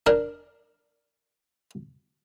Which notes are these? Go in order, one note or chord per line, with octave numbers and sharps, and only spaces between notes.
D4 A#4